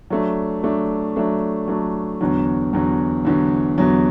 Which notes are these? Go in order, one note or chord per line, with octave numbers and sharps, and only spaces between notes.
F#3 A3 D4
F#3 A3 D4
F#3 A3 D4
F#3 A3 D4
E2 D3 F#3
E2 D3 F#3
E2 D3 F#3
E2 D3 F#3